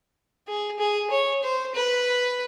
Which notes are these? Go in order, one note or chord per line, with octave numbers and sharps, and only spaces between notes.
G#4
G#4
C#5
C5
B4